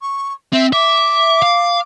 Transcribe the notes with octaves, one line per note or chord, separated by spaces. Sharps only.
C#6
C4 E5
E5 D6
F5